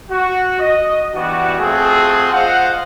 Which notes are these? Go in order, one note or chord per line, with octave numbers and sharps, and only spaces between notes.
F#4
D#5
E3 G3 B3 D4 F#4
A3 C4 F4 F#4 G#4
F4 C5 D#5 F5 F#5